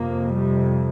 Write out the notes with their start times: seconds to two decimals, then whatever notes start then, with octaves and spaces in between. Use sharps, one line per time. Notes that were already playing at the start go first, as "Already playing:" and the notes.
Already playing: F2 C3 A#3
0.33 G3